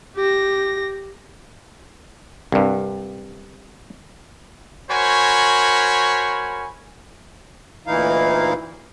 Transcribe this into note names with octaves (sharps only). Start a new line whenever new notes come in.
G4 A#6
C2 G2
F#4 A#4 C5 C#5 G#5 B5
D2 A#2 E3 D#4 E4 F5